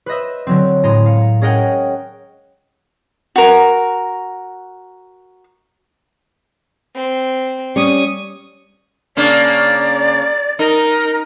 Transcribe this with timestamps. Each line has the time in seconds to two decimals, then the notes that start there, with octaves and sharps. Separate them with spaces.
0.06 B4 C5 D#5 E5
0.47 D3 F#3 C4
0.83 A2 G#3 A#5 C6 D#7
1.06 F5 C#7
1.41 C#4 G#4 A#4 D#5 F#5 G5
3.36 F#4 A#4
6.95 C4
7.76 G3 C#4 C#6 D#6
9.17 C#3 A#3 D4 D5
10.59 D#4 A#4